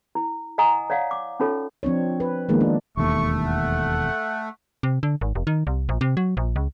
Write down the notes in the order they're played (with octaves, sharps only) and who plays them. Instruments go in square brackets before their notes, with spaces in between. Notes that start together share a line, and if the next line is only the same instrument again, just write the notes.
[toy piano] E4
D#5 F#5 G#5 A#5 D#6
C#5 D5 F5 F#5
D6
C#4 D#4 F4 A4 C#5
[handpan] F3 C4 D4 C#5
B4
D#3 F3 G#3 A#3 B3 D#4
D4
[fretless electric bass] E1 D#2 [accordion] A3 [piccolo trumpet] C#6
[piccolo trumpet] F#5
[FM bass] C3
D3
G#1
F1
D#3
C2
A#1
C3
F#3
A#1
C#2